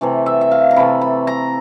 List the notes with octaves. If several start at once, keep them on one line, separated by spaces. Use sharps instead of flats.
C3 E3 A3
E5
E5
F5
A#5
C3 E3 A3 B5
B5
A#5